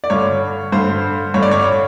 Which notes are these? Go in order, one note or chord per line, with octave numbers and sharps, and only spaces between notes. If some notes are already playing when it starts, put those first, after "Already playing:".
D5
G2 D3 C#5
G2 D3 C5
G2 D3 C#5
D5
C#5